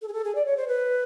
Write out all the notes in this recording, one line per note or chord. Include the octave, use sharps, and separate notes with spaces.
A4
G#4
A4
G#4
D5
C#5
C5
B4